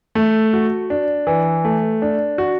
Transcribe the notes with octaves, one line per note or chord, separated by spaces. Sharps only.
A3
F#4
D4
E3
A3
D4
F#4